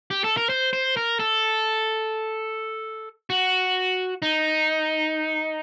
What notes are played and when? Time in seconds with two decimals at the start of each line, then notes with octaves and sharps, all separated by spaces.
0.11 G4
0.24 A4
0.37 A#4
0.49 C5
0.73 C5
0.97 A#4
1.20 A4
3.30 F#4
4.22 D#4